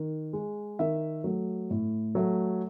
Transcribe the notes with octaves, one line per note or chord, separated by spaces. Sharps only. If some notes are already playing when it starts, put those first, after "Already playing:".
Already playing: D#3
G#3
D#3 E5
F#3 A3
A2
F#3 A3